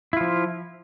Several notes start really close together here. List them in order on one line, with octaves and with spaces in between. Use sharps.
E4 F4 F3